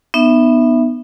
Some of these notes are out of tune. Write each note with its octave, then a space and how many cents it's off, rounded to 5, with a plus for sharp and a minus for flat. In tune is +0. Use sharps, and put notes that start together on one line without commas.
B3 +0 D#4 -35 E5 +0